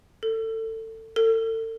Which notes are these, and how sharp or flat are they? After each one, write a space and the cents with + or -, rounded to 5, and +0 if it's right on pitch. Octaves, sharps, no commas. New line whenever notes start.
A4 +25
A4 +40